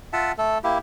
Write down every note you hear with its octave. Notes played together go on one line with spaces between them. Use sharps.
F4 E5 F#5 A5
A3 A4
A#3 E4 G4